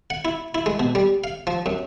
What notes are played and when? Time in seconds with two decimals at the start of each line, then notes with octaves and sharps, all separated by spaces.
0.10 F#5
0.25 E4
0.55 E4
0.66 G#3
0.79 B2
0.95 G3
1.24 F5
1.47 F3
1.66 F#2